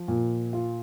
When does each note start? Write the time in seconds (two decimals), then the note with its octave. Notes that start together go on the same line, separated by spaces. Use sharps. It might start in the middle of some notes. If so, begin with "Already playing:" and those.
Already playing: F3
0.08 A#2
0.53 F4